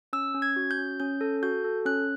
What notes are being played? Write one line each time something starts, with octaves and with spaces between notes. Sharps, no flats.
C#4 E6
C#4
G#6
F#4
G6
C#4
C#4 G6
A4
F#4 G6
A4
C#4 F#6